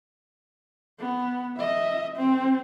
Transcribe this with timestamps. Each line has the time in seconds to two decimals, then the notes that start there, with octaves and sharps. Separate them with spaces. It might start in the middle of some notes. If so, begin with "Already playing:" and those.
0.99 B3
1.57 D#5 E5
2.17 C4